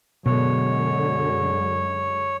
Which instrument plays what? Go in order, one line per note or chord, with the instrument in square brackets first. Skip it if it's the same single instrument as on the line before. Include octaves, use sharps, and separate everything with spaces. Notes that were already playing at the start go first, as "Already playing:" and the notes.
[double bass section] F#2 D3 G#3 [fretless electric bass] B2 [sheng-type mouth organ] C#5